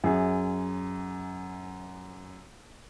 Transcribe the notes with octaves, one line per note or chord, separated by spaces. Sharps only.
F#2 G#4